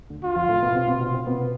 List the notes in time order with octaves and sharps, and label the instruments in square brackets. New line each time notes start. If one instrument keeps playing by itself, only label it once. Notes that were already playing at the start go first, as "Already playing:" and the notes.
[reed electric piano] D2 D3
[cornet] F4
[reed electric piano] F2 F3
A2 A3
B2 B3
C3 C4
B2 B3
B2 B3
C3 C4
B2 B3